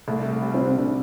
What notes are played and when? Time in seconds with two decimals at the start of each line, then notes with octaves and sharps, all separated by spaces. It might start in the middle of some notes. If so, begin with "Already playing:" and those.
0.08 C2 A3
0.25 C3
0.31 A3
0.42 G3
0.54 C4
0.61 C2
0.77 C2 D4